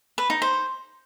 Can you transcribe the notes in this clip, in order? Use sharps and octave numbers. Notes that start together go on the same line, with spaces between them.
B4
D#4
C5